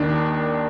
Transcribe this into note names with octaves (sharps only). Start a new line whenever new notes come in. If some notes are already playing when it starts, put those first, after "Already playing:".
Already playing: D#2 D#3 D4